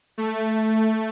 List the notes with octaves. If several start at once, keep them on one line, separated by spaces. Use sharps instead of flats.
A3